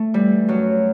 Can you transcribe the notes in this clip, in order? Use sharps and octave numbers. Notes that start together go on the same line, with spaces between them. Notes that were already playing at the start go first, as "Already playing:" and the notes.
Already playing: A3
E3 G3
F#2 F#3